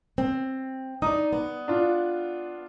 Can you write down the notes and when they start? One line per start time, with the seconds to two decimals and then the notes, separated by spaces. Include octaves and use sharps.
0.18 C4
1.02 D#4 D5 D#6
1.33 B3
1.68 D4 F4